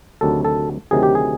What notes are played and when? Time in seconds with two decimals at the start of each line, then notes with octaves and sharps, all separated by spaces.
0.21 D2 C3 D#3 F#3 A4
0.45 A4
0.91 D2 C3 D#3 F#3 G#4
1.03 G4
1.15 G#4